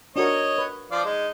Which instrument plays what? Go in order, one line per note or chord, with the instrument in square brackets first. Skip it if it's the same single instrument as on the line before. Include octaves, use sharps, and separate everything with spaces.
[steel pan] D4 F#4 A#4 [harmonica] C#5 D#5
[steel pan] B4
[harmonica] F3 D5 F5
G#3 D#4